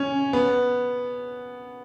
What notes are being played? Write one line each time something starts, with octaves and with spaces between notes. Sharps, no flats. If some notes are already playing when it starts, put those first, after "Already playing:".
Already playing: C#4
B3